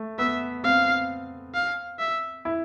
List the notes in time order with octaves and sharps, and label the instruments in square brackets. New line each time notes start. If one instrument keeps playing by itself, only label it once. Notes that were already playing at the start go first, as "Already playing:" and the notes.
Already playing: [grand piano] A3
[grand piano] B3 [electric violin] E5
[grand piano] C4 [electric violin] F5
[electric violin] F5
E5
[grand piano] E4